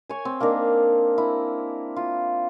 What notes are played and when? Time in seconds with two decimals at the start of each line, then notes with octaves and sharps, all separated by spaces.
0.10 C#5 G#5
0.25 C4
0.40 A#3 D4 D#4 A#4
1.18 E4
1.96 F4